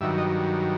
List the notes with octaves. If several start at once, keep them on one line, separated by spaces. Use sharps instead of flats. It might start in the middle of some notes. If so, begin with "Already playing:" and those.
G2 D#3 F#3 E5
D#5